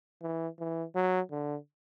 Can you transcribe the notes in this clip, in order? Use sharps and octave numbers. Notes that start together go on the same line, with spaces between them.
E3
E3
F#3
D3